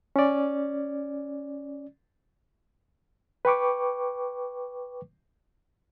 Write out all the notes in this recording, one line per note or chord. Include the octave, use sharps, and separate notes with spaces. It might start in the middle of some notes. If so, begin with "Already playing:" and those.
C#4 D5
B4 G5 C#6 D6